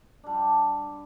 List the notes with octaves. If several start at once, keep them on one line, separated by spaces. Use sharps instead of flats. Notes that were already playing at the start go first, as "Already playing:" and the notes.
G3 D4